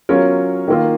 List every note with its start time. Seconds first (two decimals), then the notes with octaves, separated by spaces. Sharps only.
0.09 F#3 C#4 F4 A#4 C#5
0.68 D#3 A#3 F4